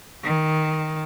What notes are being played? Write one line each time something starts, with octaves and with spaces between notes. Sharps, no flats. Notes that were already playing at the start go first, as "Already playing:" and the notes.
D#3